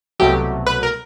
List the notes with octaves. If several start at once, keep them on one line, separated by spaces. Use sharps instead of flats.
C2 B2 F#3 A3 G4
B4
A#4